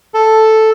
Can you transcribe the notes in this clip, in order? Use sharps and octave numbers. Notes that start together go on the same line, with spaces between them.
A4